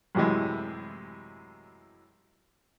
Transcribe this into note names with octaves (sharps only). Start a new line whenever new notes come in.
F#2 A2 C3 E3 G#3